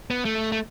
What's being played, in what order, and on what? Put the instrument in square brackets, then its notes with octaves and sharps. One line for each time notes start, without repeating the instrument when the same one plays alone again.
[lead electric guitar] B3
A3
A3